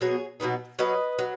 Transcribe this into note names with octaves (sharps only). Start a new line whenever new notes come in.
B2 F#3 B3 G#4 C#5
B2 F#3 B3 D#4
F#3 C#4 B4 D#5
F#3